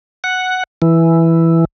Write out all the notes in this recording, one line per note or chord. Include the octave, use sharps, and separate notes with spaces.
F#5
E3